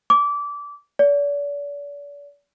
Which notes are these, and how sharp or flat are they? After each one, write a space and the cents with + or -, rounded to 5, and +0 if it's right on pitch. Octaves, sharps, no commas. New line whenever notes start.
D6 -20
D5 -40